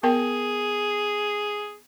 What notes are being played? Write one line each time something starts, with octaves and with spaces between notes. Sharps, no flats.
B3 G#4 A#4 G5